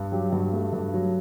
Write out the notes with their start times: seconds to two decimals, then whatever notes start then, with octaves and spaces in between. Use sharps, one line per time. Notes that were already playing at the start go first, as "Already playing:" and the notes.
Already playing: G2
0.12 F#3 G4
0.32 G2 F#4
0.53 A3
0.73 G2
0.94 F#3